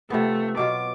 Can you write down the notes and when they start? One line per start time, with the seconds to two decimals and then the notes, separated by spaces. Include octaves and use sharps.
0.10 C3 F3 A3 B3
0.57 B2 F#3 F4 D6